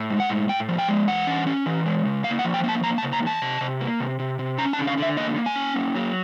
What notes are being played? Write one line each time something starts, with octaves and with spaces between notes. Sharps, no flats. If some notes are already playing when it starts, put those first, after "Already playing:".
Already playing: A2
G#3
F#5
A2
A2 G5
F3
G5
G#3
E3 F#5
C#4
C#4
E3
G#3
C#3
A#3 F5
F#5
F3
G5
A#3 A5
A#3 A#5
A5
C#3
A#5
E2
A5
C3
C3
A#3
C3
C3
C3
C#4 A#5
A5
D3
F5
D3 E5
A#3 D#5
A#3
G#5
C#4
A#3
F#3